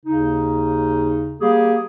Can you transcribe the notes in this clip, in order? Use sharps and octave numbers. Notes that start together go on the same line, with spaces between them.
D#2 C#3 D#4
G3 A#3 G4 G#4